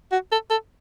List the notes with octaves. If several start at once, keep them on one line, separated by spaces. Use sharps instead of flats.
F#4
A4
A4